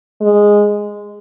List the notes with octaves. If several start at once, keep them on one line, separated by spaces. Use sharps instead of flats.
G#3